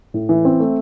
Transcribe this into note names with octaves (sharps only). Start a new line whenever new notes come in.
A2
E3
C4
A3